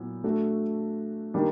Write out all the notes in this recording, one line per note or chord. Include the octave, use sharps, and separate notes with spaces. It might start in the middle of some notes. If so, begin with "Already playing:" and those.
Already playing: A#2 F#3 B3 E4
A3 D4 F#4 A4
D#3 G3 A#3 D4